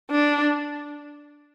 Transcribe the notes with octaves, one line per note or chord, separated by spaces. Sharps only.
D4